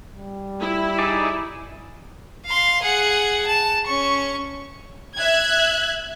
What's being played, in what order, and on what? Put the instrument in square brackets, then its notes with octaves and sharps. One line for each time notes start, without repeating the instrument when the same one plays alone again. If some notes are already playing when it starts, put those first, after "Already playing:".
[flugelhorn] G3
[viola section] E4
[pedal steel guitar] D#4 G#4 D5
[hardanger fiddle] F5 C6
G#4 F#5
A5
C#4 C#6
[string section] E5 F#6 G#6